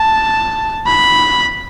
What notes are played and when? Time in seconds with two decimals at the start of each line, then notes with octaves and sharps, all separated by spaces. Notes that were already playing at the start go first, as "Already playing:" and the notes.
Already playing: A5
0.86 B5